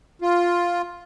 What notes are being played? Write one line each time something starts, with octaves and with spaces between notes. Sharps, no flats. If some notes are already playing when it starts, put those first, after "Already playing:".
F4